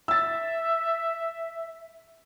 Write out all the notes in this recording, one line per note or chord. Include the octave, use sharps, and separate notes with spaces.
E5 E6 A6